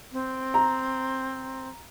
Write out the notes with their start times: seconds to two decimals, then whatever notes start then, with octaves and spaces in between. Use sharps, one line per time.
0.12 C4
0.54 A#5